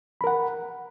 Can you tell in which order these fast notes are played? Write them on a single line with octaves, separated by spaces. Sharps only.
B5 A#4 F#5